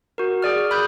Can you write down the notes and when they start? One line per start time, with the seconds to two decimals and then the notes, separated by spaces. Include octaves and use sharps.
0.18 F#4 A#4
0.42 G#4 D5 F6
0.71 B5 D#6 F#6 G6